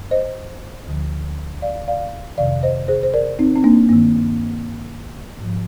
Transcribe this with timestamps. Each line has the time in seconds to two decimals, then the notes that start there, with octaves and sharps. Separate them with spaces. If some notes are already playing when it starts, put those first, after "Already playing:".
Already playing: G2
0.11 C5 D#5
0.87 D2 D3 F3
1.62 D5 F5
1.88 D5 F5
2.38 F2 C3 D#3 D5 F5
2.63 C5 D#5
2.88 G#4 C5
3.03 C5
3.14 A#4 D5
3.39 C4 D#4
3.56 C4
3.64 A#3 D4
3.89 G2 D#3 A#3
5.40 G#2 F3